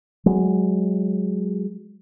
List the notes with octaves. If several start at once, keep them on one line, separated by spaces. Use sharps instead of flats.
F#3 G#3